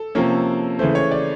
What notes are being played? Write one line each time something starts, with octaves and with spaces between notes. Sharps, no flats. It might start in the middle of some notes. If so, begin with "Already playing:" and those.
Already playing: A4
C3 F3 A#3 C#4
C#3 E3 A3 C5
C#5
D5